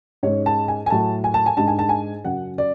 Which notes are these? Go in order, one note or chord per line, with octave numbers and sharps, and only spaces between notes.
G#2 G#3 C#4 C#5
A5
G#5
G#5
A2 F#3 A3 A5
G#5
A5
G#5
G#2 G#3 D4 A5
G#5
A5
G#5
F#2 C#3 F#3 F#5
D5